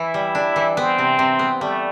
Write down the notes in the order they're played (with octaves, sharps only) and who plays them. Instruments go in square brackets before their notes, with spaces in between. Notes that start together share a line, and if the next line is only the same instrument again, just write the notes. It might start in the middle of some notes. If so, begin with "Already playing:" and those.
Already playing: [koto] E3 [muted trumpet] E4
[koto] G3
D4
E3
[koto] B3 [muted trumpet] C4
[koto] C3
C3
B3
[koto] G3 [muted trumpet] A3